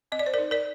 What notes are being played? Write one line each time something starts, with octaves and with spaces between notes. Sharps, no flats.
C4 D#5
D5
C5
A#4 D5
D#4
A#4 D5